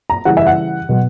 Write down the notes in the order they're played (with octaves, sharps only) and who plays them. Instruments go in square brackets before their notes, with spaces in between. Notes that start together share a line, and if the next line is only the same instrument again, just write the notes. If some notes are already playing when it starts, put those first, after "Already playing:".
[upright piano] A#5
C#3 E3 G3 F#5
E5
F#5
B2 F#3